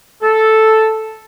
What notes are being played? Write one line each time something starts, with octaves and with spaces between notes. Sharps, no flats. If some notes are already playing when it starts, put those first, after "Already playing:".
A4